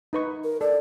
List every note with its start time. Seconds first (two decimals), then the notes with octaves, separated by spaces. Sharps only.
0.13 D#4 B4 C#6
0.44 A#4
0.61 A4 D5